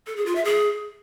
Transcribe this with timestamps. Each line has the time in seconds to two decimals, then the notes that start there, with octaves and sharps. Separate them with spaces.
0.07 A4
0.16 G#4
0.26 F4
0.35 E5
0.45 G#4